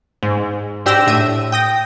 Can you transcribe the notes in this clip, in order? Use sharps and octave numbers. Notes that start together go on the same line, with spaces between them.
G#2
G#2 D4 G4 E6 A#6
A2 E5 D#7
G5 D#6 A#6